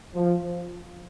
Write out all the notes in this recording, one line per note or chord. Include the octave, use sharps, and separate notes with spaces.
F3